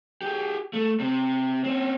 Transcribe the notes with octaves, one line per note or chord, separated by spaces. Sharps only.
G4 G#4
A3
C3 C4
C4 C#4